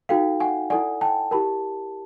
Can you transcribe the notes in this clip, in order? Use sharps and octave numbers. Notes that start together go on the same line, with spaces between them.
D#4 F#4 A4 F5 G5
F#5 G#5
E4 A4 D5 F#5 G#5
G5 A5
E4 G4 A#4 A5 B5